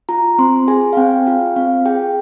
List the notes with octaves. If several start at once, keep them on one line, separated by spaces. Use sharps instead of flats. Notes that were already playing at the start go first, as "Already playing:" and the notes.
F4 A#5
C4 C6
G#4 G#5
F5
C4 G5
F4 F5
C4 F5
G#4 G5